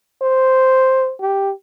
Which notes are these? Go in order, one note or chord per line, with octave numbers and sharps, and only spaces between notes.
C5
G4